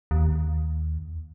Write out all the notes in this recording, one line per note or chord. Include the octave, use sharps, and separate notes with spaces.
D#2